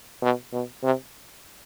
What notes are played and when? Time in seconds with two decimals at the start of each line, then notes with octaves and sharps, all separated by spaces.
0.22 B2
0.53 B2
0.83 C3